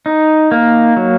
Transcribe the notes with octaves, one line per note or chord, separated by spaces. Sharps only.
D#4
A#3
F#3